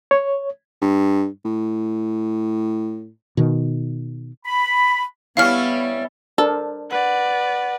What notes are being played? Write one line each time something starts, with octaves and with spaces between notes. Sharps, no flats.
C#5
G2
A2
B2 D#3
B5
G3 B3 C#4 E4 F5 F6
D4 A4 A#4 C5
B4 D5 F#5